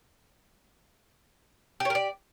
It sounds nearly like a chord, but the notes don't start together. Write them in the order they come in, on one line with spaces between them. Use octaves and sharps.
G4 C#5 A#4 D5